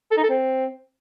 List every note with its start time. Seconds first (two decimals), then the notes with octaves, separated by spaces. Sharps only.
0.11 A4
0.17 D#4
0.23 A4
0.29 C4